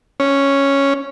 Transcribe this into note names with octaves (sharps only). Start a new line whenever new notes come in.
C#4